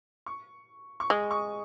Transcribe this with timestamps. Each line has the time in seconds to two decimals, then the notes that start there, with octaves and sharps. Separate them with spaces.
0.26 C#6
1.00 C#6
1.10 G#3 D#6
1.31 C#6